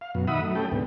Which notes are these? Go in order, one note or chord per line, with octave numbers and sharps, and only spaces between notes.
F5
F#2 B2
D#3 E5 F#5 B5 D#6
F#3 A3
A3 C#4 G4 A4 G5
D2 G#2 C3 B3